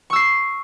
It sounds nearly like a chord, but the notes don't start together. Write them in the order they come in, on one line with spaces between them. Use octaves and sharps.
C#6 E6 C7